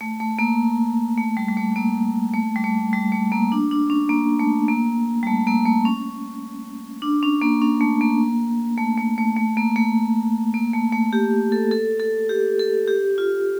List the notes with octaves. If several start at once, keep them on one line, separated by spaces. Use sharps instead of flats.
A3
A3
A#3
A3
G3
G3
A3
A#3
A3
G3
A3
G3
A3
A#3
D4
D4
C#4
A#3
A3
A#3
G3
A3
A#3
A3
C#4
D4
C#4
A#3
C#4
A3
A#3
A3
A3
A3
A3
A#3
A3
A#3
A3
A3
G4
A4
A4
A4
G4
A4
G4
F4